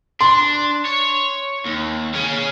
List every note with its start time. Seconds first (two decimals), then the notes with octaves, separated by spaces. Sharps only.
0.21 D4 C6
0.86 C#5
1.66 D#2
2.14 C#4 G#4